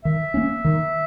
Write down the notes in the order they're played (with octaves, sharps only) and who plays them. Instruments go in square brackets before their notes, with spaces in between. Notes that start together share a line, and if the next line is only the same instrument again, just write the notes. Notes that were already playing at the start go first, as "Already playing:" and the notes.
[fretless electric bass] D#3 [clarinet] E5
[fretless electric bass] A#3 C#4
D#3